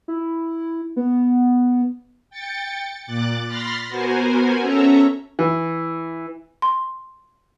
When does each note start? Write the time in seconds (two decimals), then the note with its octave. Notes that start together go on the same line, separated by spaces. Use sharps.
0.08 E4
0.96 B3
2.30 G5 A6 C#7
3.06 A#2 D6 F#6 A6
3.48 B5 C6 F6 A6 A#6 C7
3.88 B3 F#4 A#4 C5 G#5
4.60 C#4 A4 C#5 E5 A#5
5.39 E3
6.62 C6